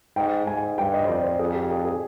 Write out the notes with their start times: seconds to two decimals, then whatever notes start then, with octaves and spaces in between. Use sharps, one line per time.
0.16 G#2 G5
0.47 G#2 G#5
0.78 G2 G5
0.94 D#5
1.05 C5
1.08 F2 D5
1.24 C5
1.39 F2 G#4
1.55 G4
1.71 G#4
1.85 G#4